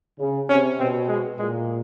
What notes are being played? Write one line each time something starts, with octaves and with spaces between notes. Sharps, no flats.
C#3
C3 C#4
B2 C4
G#3
A#2 G#3